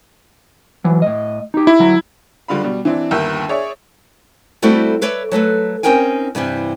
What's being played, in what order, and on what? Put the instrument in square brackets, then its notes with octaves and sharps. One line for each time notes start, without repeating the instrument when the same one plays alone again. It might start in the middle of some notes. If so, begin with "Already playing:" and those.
[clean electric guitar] E3 F#3
A2 D#5
D#4 G4
[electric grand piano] E4
[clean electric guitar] D2 F#3 A#5
[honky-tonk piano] F#1 D3 G3 F4 F5 B5
B2 G3
E3 C4 D4
G1 D#2 A#4 E5 E6 G6
G#4 C#5 D5 E5 C#6
[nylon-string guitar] G3 A3 C4 E4 F#4 A4
A4 B4 C#5 D5 E5
F#3 A3 A4 B4
C4 C#4 D#4 A#4 G5 G#5
G2 C3 E3 G3